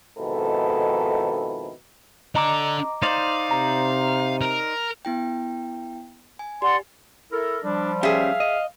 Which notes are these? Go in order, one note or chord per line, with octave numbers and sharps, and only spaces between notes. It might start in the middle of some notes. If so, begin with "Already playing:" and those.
F2 G#2 B2 D#3 E4 A4
D4 A4 D#5 A#5 D6
D#4 C5 D5 F5
C3 A#5
A#4
B3 E4 G5
G#5
G4 D5 F#5 C6
E4 A4 A#4
F3 G3 D4
C#4 G4 G#4 E5 F5
D#5